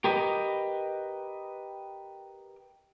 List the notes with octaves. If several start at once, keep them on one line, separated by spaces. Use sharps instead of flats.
G4 A#4 B4 D#5